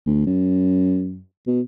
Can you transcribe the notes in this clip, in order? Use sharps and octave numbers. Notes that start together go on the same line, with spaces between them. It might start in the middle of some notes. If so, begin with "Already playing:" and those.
D2
F#2
B2